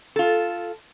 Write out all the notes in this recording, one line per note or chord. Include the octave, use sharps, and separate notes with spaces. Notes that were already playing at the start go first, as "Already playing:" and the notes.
F4 A4